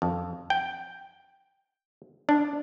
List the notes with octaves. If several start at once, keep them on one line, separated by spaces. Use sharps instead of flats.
F2
G5
D4